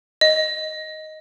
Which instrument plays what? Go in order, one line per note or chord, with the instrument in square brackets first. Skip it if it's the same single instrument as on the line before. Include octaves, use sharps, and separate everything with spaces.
[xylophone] D#5